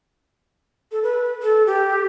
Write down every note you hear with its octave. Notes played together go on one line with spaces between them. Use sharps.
A4
B4
A4
G4